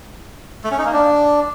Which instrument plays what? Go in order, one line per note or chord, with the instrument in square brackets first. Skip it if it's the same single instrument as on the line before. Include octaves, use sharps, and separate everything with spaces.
[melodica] A3
C#4
D#4
A#3
D4